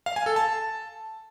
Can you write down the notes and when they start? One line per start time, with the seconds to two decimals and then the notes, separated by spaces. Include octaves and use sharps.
0.06 F5
0.16 G#5
0.26 A4
0.36 A5